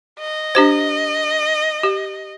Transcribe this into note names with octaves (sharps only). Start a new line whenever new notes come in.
D#5
D4 G4 C5
G4